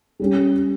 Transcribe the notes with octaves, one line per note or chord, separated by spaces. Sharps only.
G3 C#4 G4